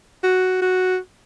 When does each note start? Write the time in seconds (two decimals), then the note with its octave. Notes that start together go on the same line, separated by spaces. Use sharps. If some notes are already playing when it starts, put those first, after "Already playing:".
0.23 F#4
0.62 F#4